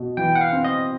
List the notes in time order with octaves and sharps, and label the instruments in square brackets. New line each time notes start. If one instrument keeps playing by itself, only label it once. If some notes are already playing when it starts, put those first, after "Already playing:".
Already playing: [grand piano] B2
[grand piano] E3 [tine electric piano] G5
[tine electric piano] F#5
F5
[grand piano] C4
[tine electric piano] D#5